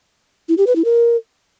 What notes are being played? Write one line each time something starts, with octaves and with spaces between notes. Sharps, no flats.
E4
G4
B4
E4
A#4